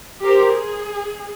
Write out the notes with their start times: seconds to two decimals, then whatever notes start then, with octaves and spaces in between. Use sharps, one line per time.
0.23 G4 A#4 C5
0.55 G#4